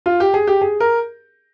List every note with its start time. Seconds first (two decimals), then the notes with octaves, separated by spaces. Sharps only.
0.06 F4
0.20 G4
0.34 G#4
0.47 G4
0.61 G#4
0.80 A#4